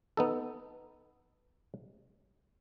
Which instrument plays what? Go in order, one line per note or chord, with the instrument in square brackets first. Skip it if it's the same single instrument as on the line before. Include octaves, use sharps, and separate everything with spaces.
[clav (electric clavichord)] B3 D#4 A4